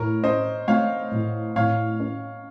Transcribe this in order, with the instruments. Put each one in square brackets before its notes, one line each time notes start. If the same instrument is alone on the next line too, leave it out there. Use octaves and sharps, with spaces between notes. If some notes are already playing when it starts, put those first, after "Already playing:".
Already playing: [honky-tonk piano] A2 [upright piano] A#4 C#5
[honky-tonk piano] C#4 [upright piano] C5 D#5
[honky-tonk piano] A3 [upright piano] C#5 F5
[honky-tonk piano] A2
[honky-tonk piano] A2 [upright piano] C#5 F5
[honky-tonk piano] C#4